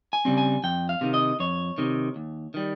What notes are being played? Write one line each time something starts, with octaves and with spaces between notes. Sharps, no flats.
G#5
C#3 G3 C4
G#5
F2 G5
F5
C3 D#3
D#5
F2 C#5
C3 D#3
D#2
D#3 G3